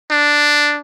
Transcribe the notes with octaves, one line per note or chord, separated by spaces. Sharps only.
D4